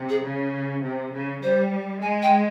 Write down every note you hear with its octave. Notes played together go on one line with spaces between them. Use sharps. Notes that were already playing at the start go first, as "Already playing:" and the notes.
Already playing: C3
G#4
C#3
C3
C#3
G3 C5
G#3 G#5
G5